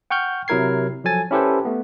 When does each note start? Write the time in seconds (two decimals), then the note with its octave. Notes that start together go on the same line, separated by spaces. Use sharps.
0.10 F#5 G5 C#6 F6 G6
0.48 C3 F#3 E4 A#4 G#6 C7
1.04 F3 F#3 A4 G#5 A6
1.31 C#4 E4 G4 A4 B4 C5
1.65 A3 B3